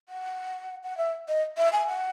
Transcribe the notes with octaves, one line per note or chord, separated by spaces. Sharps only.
F#5
F#5
E5
D#5
E5
G#5
F#5